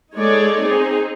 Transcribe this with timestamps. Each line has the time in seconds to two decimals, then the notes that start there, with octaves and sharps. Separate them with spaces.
0.15 G#3 D#4 A4 C#5 D5
0.62 C4 D#4 G#4